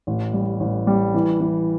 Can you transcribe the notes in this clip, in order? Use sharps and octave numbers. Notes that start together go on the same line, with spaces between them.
A1
G3
A1
G3
E3
E3